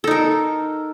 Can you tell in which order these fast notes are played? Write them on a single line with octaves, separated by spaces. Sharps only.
A4 D#4 A#4